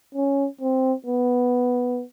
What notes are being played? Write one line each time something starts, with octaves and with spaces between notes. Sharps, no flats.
C#4
C4
B3